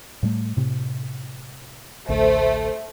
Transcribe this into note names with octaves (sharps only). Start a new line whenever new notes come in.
A2 G3 A3
A2 C3
A1 D2 A3 C5